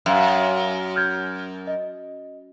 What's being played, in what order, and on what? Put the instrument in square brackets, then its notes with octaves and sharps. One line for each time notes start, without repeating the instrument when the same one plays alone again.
[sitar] F#2 [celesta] E5 F5
[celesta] F6 G6 G#6
D#5